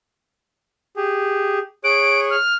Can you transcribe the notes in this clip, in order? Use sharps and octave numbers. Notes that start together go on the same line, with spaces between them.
G4 G#4
G#4 C#5 F#6 D7
F6